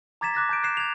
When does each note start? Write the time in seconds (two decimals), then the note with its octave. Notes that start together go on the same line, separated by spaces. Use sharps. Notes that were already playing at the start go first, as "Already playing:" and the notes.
0.21 A#5 D6 G#6 A6 B6 E7
0.34 D6 F#6 A6 A#6
0.49 A5 G6 D7
0.63 F#6 G#6 C7 E7
0.77 G#6 F7